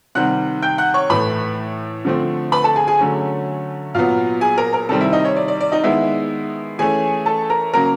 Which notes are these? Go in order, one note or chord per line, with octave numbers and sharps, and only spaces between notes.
C3 D#3 G3 C4 F#5 F#6
G5 G6
F#5 F#6
C#5 C#6
A2 E3 A3 B4 B5
D3 F3 A3 C4
B4 B5
A4 A5
G#4 G#5
G#4 G#5
D3 F#3 A3 C#4
A#2 F#3 B3 F4 F5
G#4 G#5
A#4 A#5
A#4 A#5
C3 D#3 G3 C4 A4 A5
E4 E5
D#4 D#5
C#5
D5
D5
D5
D#4 D#5
D#3 G#3 B3 E4 E5
E3 A3 C#4 G#4 G#5
A4 A5
A#4 A#5
C#3 F#3 A#3 C#4 A#4 A#5